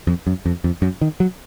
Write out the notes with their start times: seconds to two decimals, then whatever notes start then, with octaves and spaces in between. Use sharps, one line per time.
0.07 F2
0.27 F#2
0.46 F2
0.64 F2
0.82 F#2
1.01 D#3
1.20 F#3